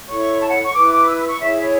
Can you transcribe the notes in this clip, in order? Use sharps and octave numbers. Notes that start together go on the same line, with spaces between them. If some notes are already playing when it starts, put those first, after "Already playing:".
E4 A4 C#5 C#6
A5
F#5
C#6
E4 B4 D6
D6
E6
E6
C#6
E4 G#4 C#5 E5
C#5